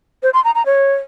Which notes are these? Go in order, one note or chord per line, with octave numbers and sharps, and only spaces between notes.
C5
C6
A#5
A#5
C#5